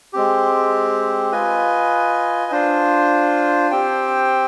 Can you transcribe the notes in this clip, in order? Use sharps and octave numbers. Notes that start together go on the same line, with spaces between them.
G#3 C4 G4
F4 B4 D#5 G#5
D4 F4 C5
C4 G4 C5 G5